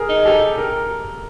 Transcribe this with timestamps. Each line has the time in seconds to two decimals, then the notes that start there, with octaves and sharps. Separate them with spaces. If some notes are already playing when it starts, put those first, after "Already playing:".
Already playing: G#4 A#4
0.09 D#4
0.25 G4 A4
0.57 A#4